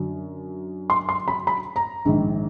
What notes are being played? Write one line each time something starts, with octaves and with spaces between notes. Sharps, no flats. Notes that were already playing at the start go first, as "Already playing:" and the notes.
Already playing: F#2 D3 F#3
C6
C6
B5
B5
A#5
A#1 G#2 D#3